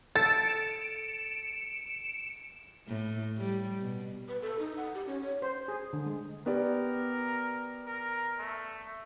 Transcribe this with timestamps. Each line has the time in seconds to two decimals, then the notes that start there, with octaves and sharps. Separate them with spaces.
0.16 A4 A6 C#7 D7 E7
2.88 A2
3.38 G3
3.81 B2
4.28 B4
4.42 A4
4.59 D#4
4.77 F#5
4.94 G4
5.07 C#4
5.22 C#5
5.42 C5
5.68 G#4
5.93 D3
6.06 G#3
6.46 B3 G4 A#4 D5
7.86 A#4
8.39 A3